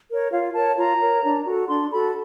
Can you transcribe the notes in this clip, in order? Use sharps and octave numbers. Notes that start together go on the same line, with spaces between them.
A#4 C#5
F4 F5
A#4 C#5 A5
F4 A#5
A#4 C#5
D4
F#4 A4
D4 C6
F#4 A4 B5